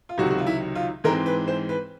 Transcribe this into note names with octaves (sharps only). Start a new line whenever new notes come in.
F4
C#2 C3 D#3 F#3 F#4
F#4
F4
E4
F4
G#2 E3 G#3 C4 A#4
B4
C5
B4